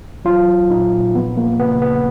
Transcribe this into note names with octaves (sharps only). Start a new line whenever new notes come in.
F#3 F4
F#3
A#2 D#4
A#2
F3 B3
F3 A#3
C#3 B3
C#3 B3